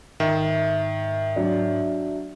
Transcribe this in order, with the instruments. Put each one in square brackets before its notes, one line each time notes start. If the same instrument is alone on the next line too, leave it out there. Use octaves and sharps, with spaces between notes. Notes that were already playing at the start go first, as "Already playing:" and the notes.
[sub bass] G#2 [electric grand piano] D#3 [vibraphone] E5
[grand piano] F#3 D4